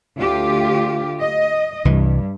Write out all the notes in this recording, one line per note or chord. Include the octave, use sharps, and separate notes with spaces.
D2 F4 G4
D#5
C2 G2 E3